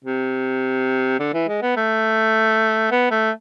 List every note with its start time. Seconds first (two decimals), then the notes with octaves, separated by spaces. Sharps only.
0.04 C3
1.20 D3
1.34 E3
1.48 G#3
1.62 B3
1.76 A3
2.91 B3
3.11 A3